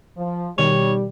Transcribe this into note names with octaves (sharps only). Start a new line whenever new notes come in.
F3
B2 D#3 G3 C#5